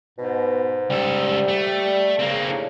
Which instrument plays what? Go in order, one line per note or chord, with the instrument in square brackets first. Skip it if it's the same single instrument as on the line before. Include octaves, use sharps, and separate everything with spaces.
[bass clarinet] G#2 [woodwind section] B2
[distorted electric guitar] C#2 A4 [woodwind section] G3
[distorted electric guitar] A3
[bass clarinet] C#3 [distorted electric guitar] A#3 C4
[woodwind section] D#2 A2 D4